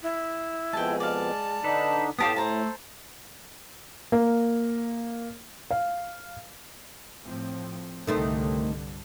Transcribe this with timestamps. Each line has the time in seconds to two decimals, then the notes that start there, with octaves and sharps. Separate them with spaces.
0.03 E4
0.73 F2 B2 G#3 G5 A5
1.00 D5 F5 A5
1.64 D3 D4 D#4 A4 B4
2.19 A2 B3 G4 C5 F5 A5 D#6
2.36 A3 C5 A5 A#5
4.12 A#3
5.71 F5
7.24 A2 F3 C4
8.07 C2 G2 D3 D#3 A3 C4